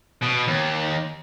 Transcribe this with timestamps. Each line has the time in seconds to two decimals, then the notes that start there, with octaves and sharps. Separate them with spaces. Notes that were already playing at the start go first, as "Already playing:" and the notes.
0.22 B2
0.47 D#2